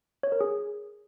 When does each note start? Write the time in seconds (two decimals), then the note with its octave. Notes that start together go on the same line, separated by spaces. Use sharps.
0.23 C#5
0.32 A#4
0.41 G#4